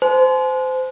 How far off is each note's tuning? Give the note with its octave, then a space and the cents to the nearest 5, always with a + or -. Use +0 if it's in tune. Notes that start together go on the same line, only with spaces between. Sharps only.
C5 -25 G#5 +45